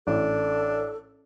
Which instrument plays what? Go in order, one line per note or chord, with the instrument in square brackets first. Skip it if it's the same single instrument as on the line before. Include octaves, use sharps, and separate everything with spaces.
[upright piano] A1 [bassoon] D4 [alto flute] A4